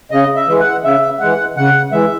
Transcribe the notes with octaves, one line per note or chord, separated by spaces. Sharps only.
C#3 D#5
E5
E3 G#3
F#5
C#3 E5
E3 G#3 F#5
C#3 F#5
E3 G#3 E5